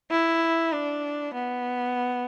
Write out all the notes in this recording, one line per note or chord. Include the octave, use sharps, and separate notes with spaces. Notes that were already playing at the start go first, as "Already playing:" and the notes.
E4
D4
B3